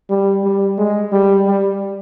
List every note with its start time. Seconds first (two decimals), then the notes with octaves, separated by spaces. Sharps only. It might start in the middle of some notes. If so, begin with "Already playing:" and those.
0.10 G3
0.44 G3
0.78 G#3
1.12 G3
1.46 G3